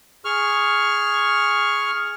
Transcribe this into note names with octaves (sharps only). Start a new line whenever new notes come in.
G#4 C#6 F6